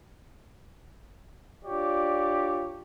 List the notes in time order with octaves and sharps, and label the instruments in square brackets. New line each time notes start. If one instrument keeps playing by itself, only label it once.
[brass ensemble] D4 F4 G4 C#5 D5